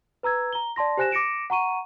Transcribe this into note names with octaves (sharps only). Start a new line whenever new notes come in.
B4 A#5 E6 G#6
A#5 G7
D5 A5 C6 A#6
G4 C5 G#5 F#6 A#6 E7
D6 A#6 C#7 D7 E7
F#5 A#5 C#6 D#7